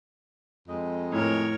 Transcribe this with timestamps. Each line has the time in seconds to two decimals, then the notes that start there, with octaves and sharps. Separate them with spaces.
0.68 F2 G#3 D#5
1.12 A2 A#4 C#5